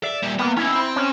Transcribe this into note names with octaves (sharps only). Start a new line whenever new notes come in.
D5 E5
A#2 G3
A#3 B3
C#4 D#4 E4
C4 C5
C#4